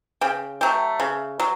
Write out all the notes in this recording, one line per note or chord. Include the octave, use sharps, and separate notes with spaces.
C#3 G5
F#3 A3 G5
C#3
F#3